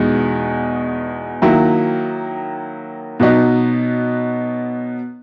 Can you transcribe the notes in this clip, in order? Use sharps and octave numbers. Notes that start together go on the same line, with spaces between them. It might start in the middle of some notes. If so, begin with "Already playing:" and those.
Already playing: E2 B2 G#3 D#4
D#3 F#3 A#3 E4
B2 F#3 B3 D#4